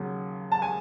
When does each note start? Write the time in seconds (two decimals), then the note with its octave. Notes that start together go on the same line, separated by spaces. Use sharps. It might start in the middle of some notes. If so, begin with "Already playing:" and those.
Already playing: D#2 C#3 F#3
0.52 A5
0.62 G#5